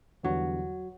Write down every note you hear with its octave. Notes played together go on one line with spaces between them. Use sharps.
E2 D3 F#3 G3